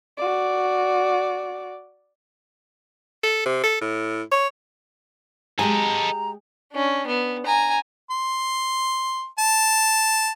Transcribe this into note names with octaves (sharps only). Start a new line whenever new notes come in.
F#4 D5
A4
C3
A4
A2
C#5
G#3 G4 A4 D#5 G#5 A#5
C#4 D4
B3
G#5 A#5
C6
A5